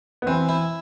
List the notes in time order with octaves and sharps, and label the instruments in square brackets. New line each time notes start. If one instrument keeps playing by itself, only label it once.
[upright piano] B3
[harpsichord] E3 [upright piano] C4
[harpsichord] E4